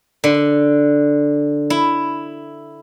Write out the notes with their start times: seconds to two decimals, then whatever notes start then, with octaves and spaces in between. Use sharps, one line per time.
0.24 D3
1.70 E4